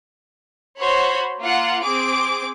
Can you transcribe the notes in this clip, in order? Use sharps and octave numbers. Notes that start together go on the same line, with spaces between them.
F#4 C5 C#5 B5
A#3 F4 F#5
C4 G#4 D6 D7